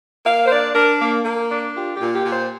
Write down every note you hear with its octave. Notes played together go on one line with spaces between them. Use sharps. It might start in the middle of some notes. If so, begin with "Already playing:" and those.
A#3 F5
C5
D4 D5
D4 A#4
A#3
A#3
D4
F4 G4
G4
A#2
G4
A#2
C5